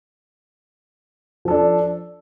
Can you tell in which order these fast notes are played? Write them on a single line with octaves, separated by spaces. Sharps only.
F3 A4 D4